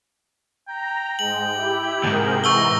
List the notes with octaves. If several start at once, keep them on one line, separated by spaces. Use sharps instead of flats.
G5 A#5
G#2 G#3 F#7
E4 G4
D2 G#2 C3 G#4 A#4
E3 A#5 C#6 E6 G7